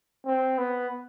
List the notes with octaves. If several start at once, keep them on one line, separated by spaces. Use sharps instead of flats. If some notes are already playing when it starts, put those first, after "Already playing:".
C4
B3